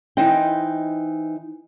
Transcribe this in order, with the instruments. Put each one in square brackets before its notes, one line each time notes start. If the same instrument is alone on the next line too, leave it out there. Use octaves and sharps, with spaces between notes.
[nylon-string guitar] E3 D#4 C5 D#5 G5